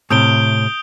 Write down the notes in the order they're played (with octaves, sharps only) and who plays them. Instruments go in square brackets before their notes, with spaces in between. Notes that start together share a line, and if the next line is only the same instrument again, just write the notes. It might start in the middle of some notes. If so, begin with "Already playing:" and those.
[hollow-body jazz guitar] A2 C3 [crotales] D#6 G6 D7 G7